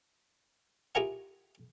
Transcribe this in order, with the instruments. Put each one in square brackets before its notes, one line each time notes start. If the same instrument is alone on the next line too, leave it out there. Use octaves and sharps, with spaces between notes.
[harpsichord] E4 F4 G4 G#4 A#4 F#5